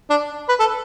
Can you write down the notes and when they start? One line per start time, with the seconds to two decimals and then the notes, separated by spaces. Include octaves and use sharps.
0.10 D4
0.49 B4
0.60 A4